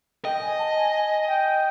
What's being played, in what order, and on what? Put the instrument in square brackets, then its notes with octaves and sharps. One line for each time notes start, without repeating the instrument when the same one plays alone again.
[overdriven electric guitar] D#5 [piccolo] G5
[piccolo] G#5
A5
G#5
G#5
G5